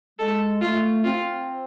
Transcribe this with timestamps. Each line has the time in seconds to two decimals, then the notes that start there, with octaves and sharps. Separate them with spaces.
0.19 G#3 A4
0.61 A3 F4
1.04 C4 F4